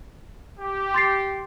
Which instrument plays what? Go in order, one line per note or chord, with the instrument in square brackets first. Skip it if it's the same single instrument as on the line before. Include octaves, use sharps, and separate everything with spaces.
[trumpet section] G4
[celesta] C6 A6 C7